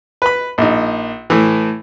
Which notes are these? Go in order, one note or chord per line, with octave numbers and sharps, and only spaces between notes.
B4 B5
A#1 D#4
A2 E3